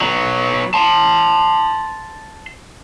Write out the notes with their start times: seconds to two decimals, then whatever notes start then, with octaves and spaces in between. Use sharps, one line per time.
0.01 F#3 B3
0.74 A5 C6